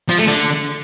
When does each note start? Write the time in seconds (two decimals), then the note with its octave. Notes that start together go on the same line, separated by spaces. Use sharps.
0.09 F3
0.18 A3
0.27 D3